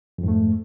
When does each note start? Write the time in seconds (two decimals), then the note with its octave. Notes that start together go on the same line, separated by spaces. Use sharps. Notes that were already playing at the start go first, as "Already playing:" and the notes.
0.18 F2
0.23 G#2
0.28 A3